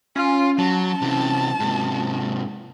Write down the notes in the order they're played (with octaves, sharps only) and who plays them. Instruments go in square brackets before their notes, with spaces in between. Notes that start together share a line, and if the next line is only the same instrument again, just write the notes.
[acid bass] C#4 [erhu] F4
[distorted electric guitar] F#3 [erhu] A5
[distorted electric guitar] C3 E3
G#2 C3